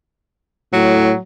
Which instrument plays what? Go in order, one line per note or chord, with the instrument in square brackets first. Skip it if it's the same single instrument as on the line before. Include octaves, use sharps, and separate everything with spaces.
[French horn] A2 [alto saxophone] F#3